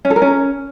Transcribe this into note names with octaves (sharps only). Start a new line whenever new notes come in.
C#4
A4
A#4
C#4